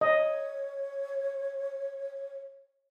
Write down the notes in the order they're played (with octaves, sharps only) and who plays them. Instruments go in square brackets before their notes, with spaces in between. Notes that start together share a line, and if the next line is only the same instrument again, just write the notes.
[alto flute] C#5 [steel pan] D#5